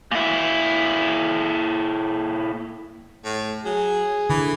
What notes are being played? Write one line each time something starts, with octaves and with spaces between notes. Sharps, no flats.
A#2 E4
A2
F#3 G#4
D3 E3